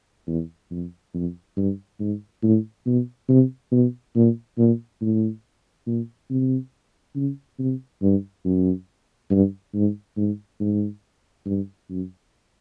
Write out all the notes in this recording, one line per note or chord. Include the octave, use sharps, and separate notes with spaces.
E2
F2
F2
G2
G#2
A2
B2
C3
B2
A#2
A#2
A2
A#2
C3
C#3
C3
G2
F#2
G2
G#2
G#2
G#2
G2
F#2